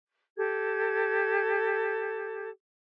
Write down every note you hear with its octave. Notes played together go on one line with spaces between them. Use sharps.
G4 A4 G#6